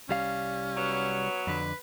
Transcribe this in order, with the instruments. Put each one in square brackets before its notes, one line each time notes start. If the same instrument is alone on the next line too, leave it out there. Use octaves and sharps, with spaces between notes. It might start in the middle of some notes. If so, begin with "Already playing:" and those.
[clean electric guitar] C2 G3 F5 [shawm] C#4
[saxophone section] F#3 B3 C#5
[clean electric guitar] F2 D3 [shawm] B4